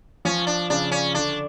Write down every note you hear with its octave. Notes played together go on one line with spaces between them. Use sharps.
F3 C#4
D4
C#3 D4
C#4
D3 D4